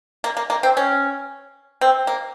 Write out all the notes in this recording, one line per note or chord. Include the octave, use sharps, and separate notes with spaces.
A#3
A#3
A#3
C4
C#4
C4
A#3